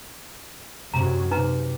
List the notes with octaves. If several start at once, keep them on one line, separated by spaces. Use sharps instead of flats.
F#2 C3 F#3 A#5
C3 D#4 B4 A#5